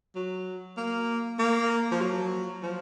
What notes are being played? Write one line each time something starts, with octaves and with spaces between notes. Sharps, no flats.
F#3
A#3
A#3
F3
F#3
F3